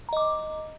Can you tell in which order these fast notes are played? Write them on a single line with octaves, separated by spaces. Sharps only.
A#5 D#5 D6